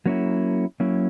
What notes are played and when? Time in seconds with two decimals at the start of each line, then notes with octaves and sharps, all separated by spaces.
0.06 F#3 A#3 C#4 E4
0.80 F#3 A#3 C#4 E4